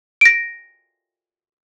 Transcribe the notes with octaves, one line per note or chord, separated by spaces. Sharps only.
A#6 D7